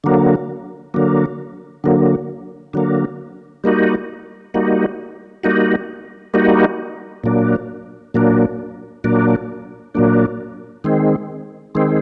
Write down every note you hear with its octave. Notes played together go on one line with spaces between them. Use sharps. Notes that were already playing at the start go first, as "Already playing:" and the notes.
D3 F#3 A#3
D3 F#3 A#3
D3 F#3 A#3
D3 F#3 A#3
G3 A#3 D#4 F#4
G3 A#3 D#4 F#4
G3 A#3 D#4 F#4
G3 A#3 D#4 F#4
A#2 F#3 A#3 D4
A#2 F#3 A#3 D4
A#2 F#3 A#3 D4
A#2 F#3 A#3 D4
D#3 G#3 C4
D#3 G#3 C4